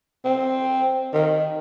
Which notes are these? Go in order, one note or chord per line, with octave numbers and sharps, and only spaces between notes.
C4
D#3